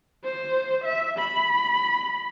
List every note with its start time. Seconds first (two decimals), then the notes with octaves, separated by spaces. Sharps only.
0.24 C5
0.84 E5
1.19 B5